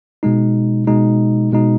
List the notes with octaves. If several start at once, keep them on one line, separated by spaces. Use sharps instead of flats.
B2 G#3 D#4
B2 G#3 D#4
B2 G#3 D#4